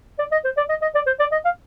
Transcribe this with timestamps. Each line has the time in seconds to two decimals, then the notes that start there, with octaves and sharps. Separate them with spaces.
0.19 D5
0.32 D#5
0.45 C5
0.57 D5
0.69 D#5
0.82 D#5
0.95 D5
1.07 C5
1.20 D5
1.32 D#5
1.45 F5